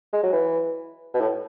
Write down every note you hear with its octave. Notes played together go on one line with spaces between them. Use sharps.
G#3
F#3
E3
B2
A2